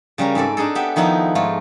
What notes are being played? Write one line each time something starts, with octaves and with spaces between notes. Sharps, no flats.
C#3 G3 C#4 A#4
G#2 C4 A4 D5
D4 D#4 G#4 A4
B3 G4 E5 G5
D#3 F3 B3 D#4 E4
G#2 A3 F4